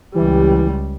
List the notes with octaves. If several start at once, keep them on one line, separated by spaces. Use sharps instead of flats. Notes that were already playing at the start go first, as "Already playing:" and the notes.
C#2 E3 G3 G4